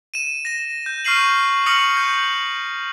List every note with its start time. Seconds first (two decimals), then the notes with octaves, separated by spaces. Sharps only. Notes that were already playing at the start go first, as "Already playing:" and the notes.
0.14 D#7 E7
0.45 A#6 E7
0.86 G6
1.05 C#6 F6 G6 C7 D#7 F#7
1.66 C#6 D#6 F6 A#6 C#7 F#7
1.97 G6